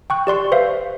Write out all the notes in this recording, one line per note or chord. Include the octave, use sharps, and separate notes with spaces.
G5 C#6 F#6
G4 D5 C6 C#6
B4 C5 E5 F5